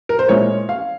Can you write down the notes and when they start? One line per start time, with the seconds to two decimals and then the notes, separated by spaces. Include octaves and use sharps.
0.09 A#4
0.19 C5
0.29 A#2 G#3 C#4 E4 C#5
0.69 F5